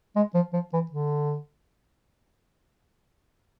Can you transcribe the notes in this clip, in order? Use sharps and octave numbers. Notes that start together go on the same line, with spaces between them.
G#3
F3
F3
E3
D3